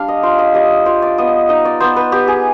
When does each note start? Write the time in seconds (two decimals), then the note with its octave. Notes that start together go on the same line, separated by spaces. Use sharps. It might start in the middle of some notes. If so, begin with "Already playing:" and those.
Already playing: G3 D4 F5
0.08 D#5
0.23 F4 C5
0.39 D#5
0.54 G3 D#5
0.86 F4 C5
1.02 D5
1.18 B3 D#5
1.49 D#4 D#5
1.65 D5
1.80 B3 C5
1.96 B4
2.12 B3 G4
2.28 G#4